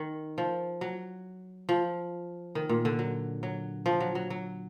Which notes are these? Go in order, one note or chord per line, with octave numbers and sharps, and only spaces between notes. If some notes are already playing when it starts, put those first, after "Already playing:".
Already playing: D#3
F3
F#3
F3
D#3
A#2
D3
F#3
F#3
F3
F#3
F#3
F#3